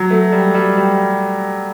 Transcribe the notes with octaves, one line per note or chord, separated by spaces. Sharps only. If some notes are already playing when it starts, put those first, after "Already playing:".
Already playing: F#3
A3
G3
G3
G3